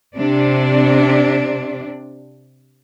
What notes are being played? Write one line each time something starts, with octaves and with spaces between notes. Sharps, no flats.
C3 D4